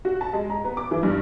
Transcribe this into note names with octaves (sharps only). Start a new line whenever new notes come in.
F#4
A5
G#3
A#5
B3
D6
E3
G2